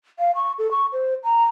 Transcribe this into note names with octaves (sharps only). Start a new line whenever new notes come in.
F5
C#6
A4
C#6
C5
A#5